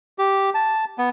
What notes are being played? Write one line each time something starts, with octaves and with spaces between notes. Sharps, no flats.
G4
A5
B3